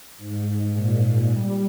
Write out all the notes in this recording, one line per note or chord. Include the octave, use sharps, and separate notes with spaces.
G#2
A#2
G3